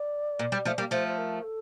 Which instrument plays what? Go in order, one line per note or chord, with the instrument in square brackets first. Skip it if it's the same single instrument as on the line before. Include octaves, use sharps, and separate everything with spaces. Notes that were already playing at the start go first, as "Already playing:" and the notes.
Already playing: [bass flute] D5
[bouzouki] A#2
G3
F3 A3
G3 A#3
[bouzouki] F3 A3 [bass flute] C5
[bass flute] C5
A#4
A4